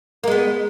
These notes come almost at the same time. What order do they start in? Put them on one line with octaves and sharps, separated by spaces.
A#3 G#3 B3